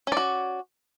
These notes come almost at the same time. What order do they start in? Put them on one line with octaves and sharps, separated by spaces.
C#4 D5 F#4